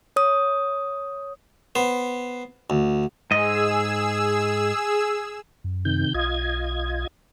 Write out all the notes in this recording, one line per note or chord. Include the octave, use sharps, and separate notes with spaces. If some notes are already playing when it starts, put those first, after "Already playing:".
C#5 D#6
B3 C5
D2
G#2 G#4 D#5 E6
F#2
C3 D#3 G6
B1 F4 D#5 G#6